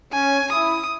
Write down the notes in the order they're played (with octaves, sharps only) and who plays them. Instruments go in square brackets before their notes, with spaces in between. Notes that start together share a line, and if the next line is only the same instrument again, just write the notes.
[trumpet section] C#4 [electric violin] G#5
[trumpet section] E4 [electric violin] D#6